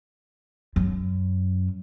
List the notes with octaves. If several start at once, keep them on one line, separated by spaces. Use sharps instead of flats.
F#2